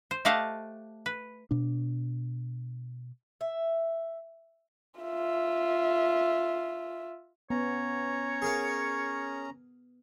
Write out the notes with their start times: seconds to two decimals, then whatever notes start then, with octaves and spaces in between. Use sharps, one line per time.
0.11 C5
0.25 A3 G4 D#5 F5 F#5 A5
1.06 B4
1.51 B2 D4
3.41 E5
5.00 F4 E5
7.50 B3 C#4 C#5 A#5
8.42 G#4 A#4 F5